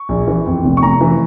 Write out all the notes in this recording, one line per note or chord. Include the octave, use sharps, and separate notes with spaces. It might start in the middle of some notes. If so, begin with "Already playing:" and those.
Already playing: C#6
A#1
E3
F2
F1
C#6
F1 A#5
E3